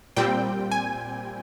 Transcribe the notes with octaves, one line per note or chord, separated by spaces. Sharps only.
A#2 G3 C4 G5
G#5